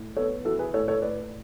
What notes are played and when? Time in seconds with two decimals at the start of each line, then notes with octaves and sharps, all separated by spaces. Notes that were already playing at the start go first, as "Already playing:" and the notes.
Already playing: A2
0.17 B3 A4 C#5
0.45 E3 F#4 A4
0.59 G#4 B4
0.74 A2 A4 C#5
0.88 A4 C#5
1.01 A2 B4 D5